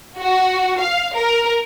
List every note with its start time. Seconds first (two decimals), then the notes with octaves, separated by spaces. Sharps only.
0.19 F#4
0.80 F5
1.16 A#4